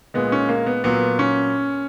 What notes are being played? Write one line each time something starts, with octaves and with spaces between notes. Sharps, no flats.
A#2 G#3 B3
C#4
A#3
B3
A#2 F#3 B3
C#4